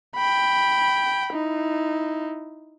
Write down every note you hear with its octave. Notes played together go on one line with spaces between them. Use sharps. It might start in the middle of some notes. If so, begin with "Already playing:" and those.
G5 B5
D#4 E4